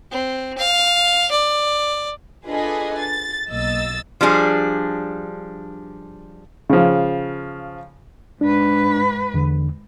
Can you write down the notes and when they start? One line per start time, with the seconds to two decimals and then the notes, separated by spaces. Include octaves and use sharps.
0.11 C4
0.58 F5
1.31 D5
2.47 D4 F4 G#4 A4 B4 D#5
2.98 A6
3.49 B1 A#3 D#5 E6 A6
4.21 F3 G3 D4 G#4
6.70 C#3 F3
8.41 G#2 D4 B4
9.34 E2 D3